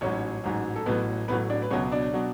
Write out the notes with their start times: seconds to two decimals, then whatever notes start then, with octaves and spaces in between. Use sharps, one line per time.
0.01 A1 G#2 F#3 C#4 C#5
0.44 A1 G#2 F#3
0.76 A4
0.86 A1 A2 F#3 B3 B4
1.28 A1 A2 F#3 B3 B4
1.50 D4 D5
1.62 B4
1.70 C#2 B2 F#3 C#4 C#5
1.92 D4 D5
2.14 B2 F#3